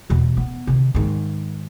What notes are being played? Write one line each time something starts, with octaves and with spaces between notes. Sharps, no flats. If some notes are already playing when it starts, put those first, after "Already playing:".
E2 B2
B3
C3 D#3
G#2 D#3